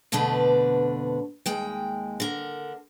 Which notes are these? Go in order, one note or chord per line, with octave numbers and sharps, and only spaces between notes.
F2 B2 D3 A3 D4 B4
D#2 G#3 G5
D3 A#4